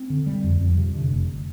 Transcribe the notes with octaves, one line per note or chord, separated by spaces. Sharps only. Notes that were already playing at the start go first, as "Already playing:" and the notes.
Already playing: C4
D3
G3
F2
F2
C3
D3
F1